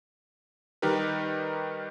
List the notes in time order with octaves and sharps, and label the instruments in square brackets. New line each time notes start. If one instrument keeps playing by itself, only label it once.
[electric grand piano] D#3 G3 D#4 G4 A#4 B4